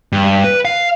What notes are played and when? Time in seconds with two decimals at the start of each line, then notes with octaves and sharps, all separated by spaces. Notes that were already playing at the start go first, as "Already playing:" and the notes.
0.12 G2
0.44 B4
0.65 F5